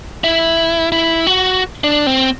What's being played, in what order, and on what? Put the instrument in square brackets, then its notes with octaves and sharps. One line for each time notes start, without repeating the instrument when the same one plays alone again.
[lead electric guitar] E4
E4
F#4
D4
C4